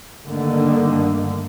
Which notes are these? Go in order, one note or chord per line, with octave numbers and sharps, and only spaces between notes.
G2 D3 D#3 A3 A#3